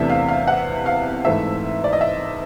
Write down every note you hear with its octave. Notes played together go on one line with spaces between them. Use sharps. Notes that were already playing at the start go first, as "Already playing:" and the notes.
Already playing: E2 C3 E3 A3 D4 E5
F5
F5
F#5
F5
G#2 E3 A3 E5
D5
D#5
E5